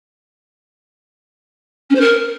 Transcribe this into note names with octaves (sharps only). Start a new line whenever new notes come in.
C#4
C5
A#4